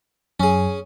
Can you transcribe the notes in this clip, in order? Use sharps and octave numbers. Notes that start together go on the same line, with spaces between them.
F#2 C#4 G#4